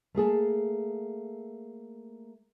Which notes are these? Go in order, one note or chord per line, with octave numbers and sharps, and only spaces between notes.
A3 A#3 G#4 A4